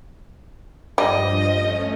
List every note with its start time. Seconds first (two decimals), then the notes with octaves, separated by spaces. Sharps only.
0.98 G2 F3 G3 D#5
1.53 A3 C#4